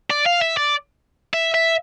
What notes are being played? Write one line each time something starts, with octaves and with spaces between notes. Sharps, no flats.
D5
F5
E5
D5
E5
E5